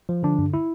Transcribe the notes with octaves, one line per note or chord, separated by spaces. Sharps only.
F3
D3 D4
G2
E4